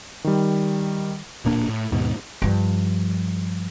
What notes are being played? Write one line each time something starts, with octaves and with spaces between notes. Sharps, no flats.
D#3 G3
D1 A#2 A#3 D4
A2
D#2 G#2 B2
G2 F3